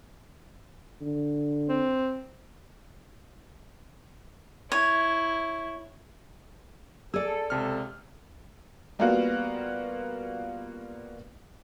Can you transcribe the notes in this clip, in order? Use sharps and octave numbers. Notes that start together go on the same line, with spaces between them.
D3
C4
E4 C#5
G#4 A4 D5 E6
C#2 C3 F6
G3 A#3 B3 F4 F#4